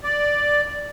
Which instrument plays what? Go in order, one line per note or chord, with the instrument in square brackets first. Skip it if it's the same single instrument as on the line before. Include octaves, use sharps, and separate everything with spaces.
[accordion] D5